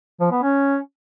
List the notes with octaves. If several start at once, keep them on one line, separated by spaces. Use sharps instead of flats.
F3
B3
C#4